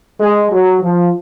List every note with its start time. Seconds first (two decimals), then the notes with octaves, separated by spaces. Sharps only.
0.20 G#3
0.51 F#3
0.82 F3